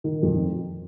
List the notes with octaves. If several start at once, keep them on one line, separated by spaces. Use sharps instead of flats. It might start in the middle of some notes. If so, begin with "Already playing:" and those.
D#3
F2